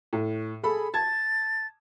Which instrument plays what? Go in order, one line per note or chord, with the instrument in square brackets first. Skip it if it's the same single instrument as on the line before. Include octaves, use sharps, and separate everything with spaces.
[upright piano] A2
[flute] G#4 [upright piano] A4 B5
[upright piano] A5 G#6 [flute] A6